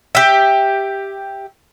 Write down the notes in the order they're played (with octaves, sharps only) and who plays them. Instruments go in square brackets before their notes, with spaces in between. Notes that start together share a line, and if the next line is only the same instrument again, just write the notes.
[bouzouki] G4 E5